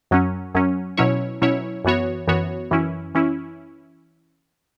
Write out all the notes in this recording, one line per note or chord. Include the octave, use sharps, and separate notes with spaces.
F#2 F#3 C#4
F#2 F#3 C#4
B2 F#3 C#4 E4 C#5
B2 F#3 C#4 E4 C#5
F#2 E3 B3 F#4 C#5
F#2 E3 B3 F#4 C#5
F#2 E3 C#4 E4
E3 C#4 E4